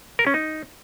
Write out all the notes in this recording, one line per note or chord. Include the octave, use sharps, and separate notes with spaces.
A#4
C#4
D#4